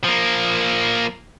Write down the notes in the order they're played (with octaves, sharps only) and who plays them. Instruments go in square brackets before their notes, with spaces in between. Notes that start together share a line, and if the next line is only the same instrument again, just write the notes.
[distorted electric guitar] F3 A#3